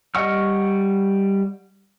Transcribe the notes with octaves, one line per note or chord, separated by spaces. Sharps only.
G3 D#5 F#5 C#6 F6